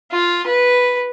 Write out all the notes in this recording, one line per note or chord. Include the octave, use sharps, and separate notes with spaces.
F4
B4